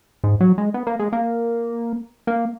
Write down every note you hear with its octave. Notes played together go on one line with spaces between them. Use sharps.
G#2
F#3
G#3
B3
A#3
G#3
A#3
A#3